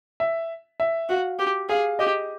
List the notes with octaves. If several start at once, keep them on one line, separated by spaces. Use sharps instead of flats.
E5
E5
F#4 F5
G4
G#4 F5
G4 D#5